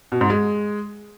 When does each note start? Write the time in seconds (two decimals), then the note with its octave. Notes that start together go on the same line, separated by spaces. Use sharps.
0.12 B2
0.21 G#2
0.30 G#3